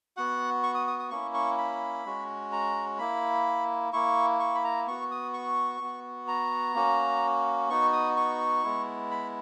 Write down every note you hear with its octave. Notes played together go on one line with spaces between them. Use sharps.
B3 F#4 F#5
C#6
D#6
D#6
D#6
A#3 C#4 E4 C#6
C#6
B5
G#3 C#4 F#4
A#5
A#3 E4 B5
A#3 E4 C#6
C#6
B5
A#5
B3 F#4 C#6
D#6
C#6
B3 F#4
A#5
A#3 C#4 F#4
B3 D#4 F#4 C#6
D#6
C#6
G#3 B3 E4
B5